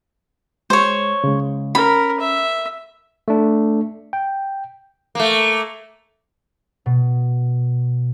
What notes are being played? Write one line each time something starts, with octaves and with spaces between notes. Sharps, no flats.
G#3 C5 C#5
C#3 G#3
C#4 A#4 B5
E5
A3 D4
G5
A3 A#3
B2